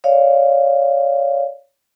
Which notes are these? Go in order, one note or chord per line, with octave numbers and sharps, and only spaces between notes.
C#5 D5 F5